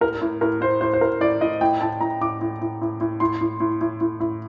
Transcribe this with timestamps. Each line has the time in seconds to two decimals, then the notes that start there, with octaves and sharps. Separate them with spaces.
0.01 A2 A#4
0.21 A2
0.41 A2 A#4
0.61 A2 C5
0.81 A2 C5
0.93 C5
1.01 A2 A#4
1.20 A2 D5
1.41 A2 D#5
1.61 A2 G5
1.81 A2 A5
2.01 A2 A#5
2.21 A2 D6
2.41 A2
2.61 A2
2.81 A2
3.01 A2
3.20 A2 C6
3.41 A2
3.60 A2
3.81 A2
4.01 A2
4.20 A2